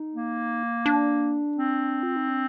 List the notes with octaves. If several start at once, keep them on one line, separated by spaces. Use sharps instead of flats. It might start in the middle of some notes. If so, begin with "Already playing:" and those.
Already playing: D#4
A#3
D4
C4
F4
D#4
D4